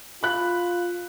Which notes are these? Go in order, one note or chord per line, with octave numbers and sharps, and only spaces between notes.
F4 B5 F#6